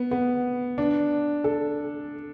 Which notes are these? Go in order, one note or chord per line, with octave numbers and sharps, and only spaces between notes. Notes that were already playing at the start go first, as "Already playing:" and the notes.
Already playing: B3
B3
D4
A4